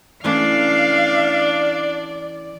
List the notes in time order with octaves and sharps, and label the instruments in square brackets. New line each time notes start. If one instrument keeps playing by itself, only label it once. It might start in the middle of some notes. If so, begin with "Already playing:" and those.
[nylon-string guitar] E3 A3 C#4 [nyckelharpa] D4 [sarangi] D5 [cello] F5